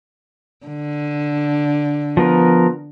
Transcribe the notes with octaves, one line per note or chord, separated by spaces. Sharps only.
D3
F3 B3 A#4